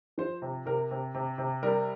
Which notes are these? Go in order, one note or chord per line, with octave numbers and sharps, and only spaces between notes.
F3 C5
C3
C3 A#4
C3
C3
C3
G3 A#4